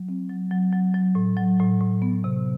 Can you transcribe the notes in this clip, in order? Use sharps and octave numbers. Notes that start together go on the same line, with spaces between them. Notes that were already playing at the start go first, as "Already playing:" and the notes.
Already playing: F#3
C4
F#3
F#3
F#3
F#3
A2
F#3
A2
A2
B3
C3